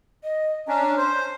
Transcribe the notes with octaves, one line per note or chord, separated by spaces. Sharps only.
D#5
C#4 D4 A#5
C5 C6